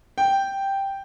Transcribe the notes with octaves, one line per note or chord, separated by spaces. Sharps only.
G5